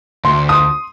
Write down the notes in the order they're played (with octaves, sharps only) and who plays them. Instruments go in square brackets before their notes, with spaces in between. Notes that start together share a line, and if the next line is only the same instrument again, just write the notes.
[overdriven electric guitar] D2 [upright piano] C6
[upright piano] C6 D#6